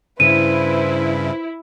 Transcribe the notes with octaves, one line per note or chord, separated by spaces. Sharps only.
G2 C#3 E4 B4 C5 D#7